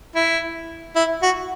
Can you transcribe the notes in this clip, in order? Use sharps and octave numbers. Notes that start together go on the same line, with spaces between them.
E4
E4
F#4